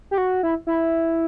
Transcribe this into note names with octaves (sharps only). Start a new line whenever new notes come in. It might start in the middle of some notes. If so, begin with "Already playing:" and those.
G4
F#4
E4
E4